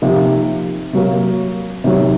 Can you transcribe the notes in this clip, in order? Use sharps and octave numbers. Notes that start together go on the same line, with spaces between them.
C3 F3 A#3 D#4
C3 F#3 A#3
C3 D#3 F#3